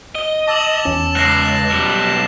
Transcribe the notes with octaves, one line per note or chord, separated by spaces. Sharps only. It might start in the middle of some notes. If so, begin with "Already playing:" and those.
D#5 G7
A5 D6 E6 F#7
E2 C#4
C#2 G#2 F#6 A#6 C7
B1 G3